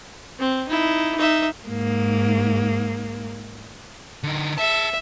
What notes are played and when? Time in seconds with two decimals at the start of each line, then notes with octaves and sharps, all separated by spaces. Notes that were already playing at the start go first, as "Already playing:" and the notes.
0.39 C4
0.68 D#4 E4
1.17 D#4 E5
1.68 G#2 A#3
4.23 D3 D#4
4.58 G#4 E5 A5